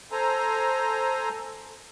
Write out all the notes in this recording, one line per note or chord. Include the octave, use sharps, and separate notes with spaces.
A4 C5 G#5 A#5